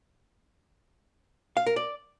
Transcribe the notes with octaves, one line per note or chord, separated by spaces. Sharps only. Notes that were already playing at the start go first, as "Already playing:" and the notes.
F5
A#4
D5